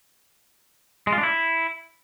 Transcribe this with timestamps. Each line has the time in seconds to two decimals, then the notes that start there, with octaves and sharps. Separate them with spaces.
1.07 G#3
1.12 F4
1.18 D4
1.23 E4